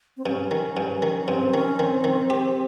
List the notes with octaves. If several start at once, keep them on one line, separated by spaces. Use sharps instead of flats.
C4
G2 C#4
D#3
G2
D#3
C#4
G2 C4
D#3 C#4
D#3 C4
D#3
G4